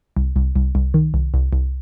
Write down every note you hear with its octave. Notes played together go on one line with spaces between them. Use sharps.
C2
C2
C2
C2
D#3
C2
C2
C2